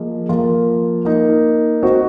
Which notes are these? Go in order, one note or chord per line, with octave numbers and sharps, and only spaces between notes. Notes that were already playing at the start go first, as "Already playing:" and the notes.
Already playing: F3 A#3 F4 G#4 D#5
F3 A#3 F4 A#4
A#3 D#4 A#4
C4 F#4 C5 D#5